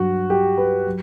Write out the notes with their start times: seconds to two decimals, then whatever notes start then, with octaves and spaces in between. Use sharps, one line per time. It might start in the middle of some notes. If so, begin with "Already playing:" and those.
Already playing: G2 F#3 F#4
0.30 G4
0.58 B4
0.86 F#3